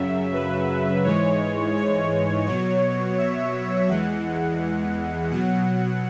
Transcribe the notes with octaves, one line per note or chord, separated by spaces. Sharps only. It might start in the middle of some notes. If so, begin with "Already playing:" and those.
Already playing: F#2 C#3 F#3 E5
B4
G#2 E3 G#3 C#5
C#5
B2 F#3 C#5
E5
E2 E3 G#3 F#5
B2 F#3 F#5